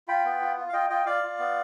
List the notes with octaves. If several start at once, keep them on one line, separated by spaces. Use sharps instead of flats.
F4 G5 B5
B3
F4
F4
F5
F4 D#5 G5
F4 D#5 G5
F4 D5 F5
F4
B3